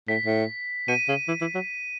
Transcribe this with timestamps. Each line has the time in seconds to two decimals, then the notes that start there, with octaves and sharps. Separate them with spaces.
0.08 A2 B6
0.25 A2
0.88 B2 D#7
1.08 C#3
1.28 E3
1.41 E3
1.55 F#3